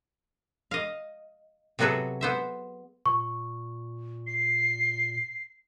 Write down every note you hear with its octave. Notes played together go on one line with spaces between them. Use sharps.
D#5 F5
C3 F#3 B3 F#4 G#4 A4
B3 C5 E5
A#2 C#6
C7